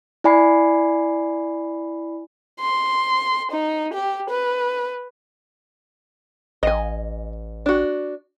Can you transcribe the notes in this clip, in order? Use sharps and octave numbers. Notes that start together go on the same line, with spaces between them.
E4 D5 G#5 B5 C7
C6
D#4
G4
B4
A1 D#5 G#5
D4 F#4